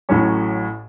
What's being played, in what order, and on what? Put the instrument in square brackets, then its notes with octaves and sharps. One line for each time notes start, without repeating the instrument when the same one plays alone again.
[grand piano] A1 A2 F#3 C#4